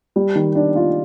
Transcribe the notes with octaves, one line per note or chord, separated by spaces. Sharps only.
G3
D#3
D4
F4